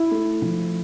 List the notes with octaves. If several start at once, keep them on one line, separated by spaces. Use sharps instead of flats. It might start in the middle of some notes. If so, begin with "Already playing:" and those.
Already playing: E4
A3
F3